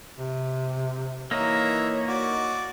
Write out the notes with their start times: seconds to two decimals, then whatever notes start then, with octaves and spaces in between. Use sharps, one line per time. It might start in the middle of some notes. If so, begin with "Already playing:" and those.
0.17 C3
1.31 E3 A#3 D#4 C#5 E5
2.08 F#4 D5